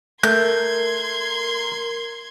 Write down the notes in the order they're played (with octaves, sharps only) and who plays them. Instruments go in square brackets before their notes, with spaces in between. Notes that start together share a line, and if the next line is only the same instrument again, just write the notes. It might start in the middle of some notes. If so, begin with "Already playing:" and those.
[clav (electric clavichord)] A3 [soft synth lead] A#4 [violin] C6 G#6 [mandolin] G6